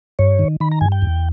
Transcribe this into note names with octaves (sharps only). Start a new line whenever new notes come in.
G2 C#5
D#3
D#3 B5
A#5
G2 G#5
G5
E2